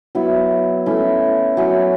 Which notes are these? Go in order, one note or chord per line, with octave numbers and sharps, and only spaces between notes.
F#3 B3 E4
A3 C#4 E4
F#3 C#4 E4